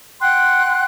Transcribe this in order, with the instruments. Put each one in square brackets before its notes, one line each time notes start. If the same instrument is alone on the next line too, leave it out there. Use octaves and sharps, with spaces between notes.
[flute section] F#5 G5 C6 F#6